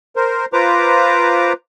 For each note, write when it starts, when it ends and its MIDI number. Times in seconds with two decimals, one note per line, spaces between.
0.16 0.45 70
0.16 0.45 72
0.53 1.53 65
0.53 1.53 71
0.53 1.53 72
0.53 1.53 82
0.53 1.53 86